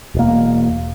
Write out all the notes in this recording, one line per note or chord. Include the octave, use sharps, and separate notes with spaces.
E1 A#3